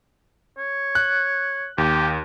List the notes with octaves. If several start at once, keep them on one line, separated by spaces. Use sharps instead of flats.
C#5
F#6
D#2 G4